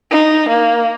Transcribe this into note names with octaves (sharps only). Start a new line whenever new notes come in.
D#4
A#3